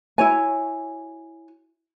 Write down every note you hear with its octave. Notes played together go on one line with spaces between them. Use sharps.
E4 F#4 C#5 G#5